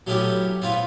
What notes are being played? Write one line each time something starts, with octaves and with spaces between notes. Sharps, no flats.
F#3 A3 B3 C#4 E4 G4
B3 C4 E4 F4 B4